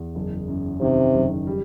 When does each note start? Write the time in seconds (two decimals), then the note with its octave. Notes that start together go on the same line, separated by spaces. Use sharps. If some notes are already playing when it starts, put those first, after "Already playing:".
Already playing: E2
0.15 F#1
0.48 F#2
0.81 C3 D#3
1.14 F#1
1.47 G3